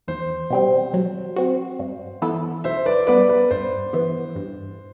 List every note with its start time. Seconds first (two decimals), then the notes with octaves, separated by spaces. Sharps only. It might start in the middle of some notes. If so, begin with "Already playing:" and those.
0.08 E2 C5
0.50 B2 G3 C4
0.94 F#3
1.36 C4 F#4
1.79 G2
2.22 E3 B3 E4 A4
2.64 B2 C5 E5
2.86 B4 D5
3.07 G3 B3 B4 D5
3.29 B4
3.51 G2 C5
3.93 E3 B3
4.36 G2